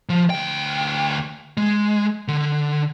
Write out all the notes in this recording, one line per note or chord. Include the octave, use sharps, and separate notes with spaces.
F3
D2 G5
G#3
D3